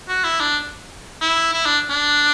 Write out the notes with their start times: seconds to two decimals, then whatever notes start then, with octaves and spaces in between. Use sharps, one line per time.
0.09 F#4
0.24 E4
0.40 D4
1.21 E4
1.54 E4
1.66 D4
1.90 D4